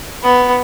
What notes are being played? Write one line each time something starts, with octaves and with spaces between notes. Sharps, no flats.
B3